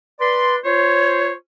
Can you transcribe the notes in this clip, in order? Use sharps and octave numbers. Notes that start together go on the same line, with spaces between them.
B4 D5 C6
F4 C5 C#5